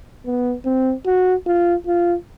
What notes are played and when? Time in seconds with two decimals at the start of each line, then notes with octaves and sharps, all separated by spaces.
0.26 B3
0.65 C4
1.06 F#4
1.46 F4
1.87 F4